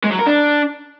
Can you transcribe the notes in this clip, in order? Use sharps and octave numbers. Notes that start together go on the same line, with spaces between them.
G#3
F#3
A#4
D4